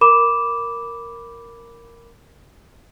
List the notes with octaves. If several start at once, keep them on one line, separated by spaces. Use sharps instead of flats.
A#4 B5 D6 E7